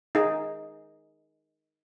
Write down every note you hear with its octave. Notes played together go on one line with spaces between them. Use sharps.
D#4 G#4